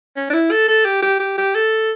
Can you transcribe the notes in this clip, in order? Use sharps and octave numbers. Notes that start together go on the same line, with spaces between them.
C#4
D4
E4
A4
A4
G4
G4
G4
G4
A4